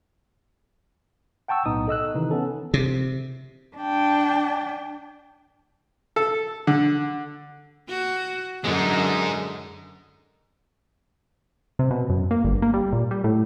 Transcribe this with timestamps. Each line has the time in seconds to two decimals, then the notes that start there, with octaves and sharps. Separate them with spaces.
1.48 F#5 G5 A5 C#6 E6
1.66 B1 A2 B3 D#4 D#6
1.87 A4 D#5 E6 F#6
2.14 C3 D#3 E3 D#4
2.31 B3 C#4 A4
2.74 C3
3.77 D4 G5
6.16 A4
6.67 D3
7.89 F#4
8.64 F#2 D3 G#3 D#4
11.79 C3
11.91 B2
12.10 F#2
12.31 A#3
12.45 G1
12.62 A#3
12.74 G3
12.93 A#2
13.11 G3
13.24 A2